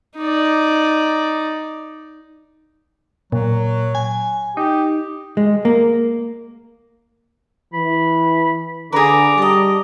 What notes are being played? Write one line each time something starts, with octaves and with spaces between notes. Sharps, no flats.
D#4 D5
A#2 F#3
G#5
D#4 G4
G#3
A#3
E3 B5
D3 G#4 B4 A#5 D6
G3 D#5 A5